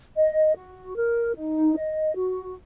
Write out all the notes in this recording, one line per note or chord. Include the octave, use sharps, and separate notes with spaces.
D#5
F#4
A#4
D#4
D#5
F#4